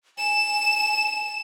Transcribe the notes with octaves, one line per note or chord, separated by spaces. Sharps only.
G#5 E7